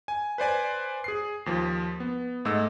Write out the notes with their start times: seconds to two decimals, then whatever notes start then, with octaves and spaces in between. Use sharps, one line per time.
0.08 G#5
0.38 B4 C5 D5 G#5
1.04 G#4 C7
1.46 D#2 F3
2.00 B3
2.45 G#2 A3 D#5 E6